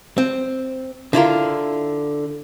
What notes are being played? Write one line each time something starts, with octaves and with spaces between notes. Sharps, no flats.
C4
D3 E4 F4 A#4